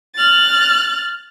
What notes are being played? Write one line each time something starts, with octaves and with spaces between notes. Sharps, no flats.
F6 F#6 A6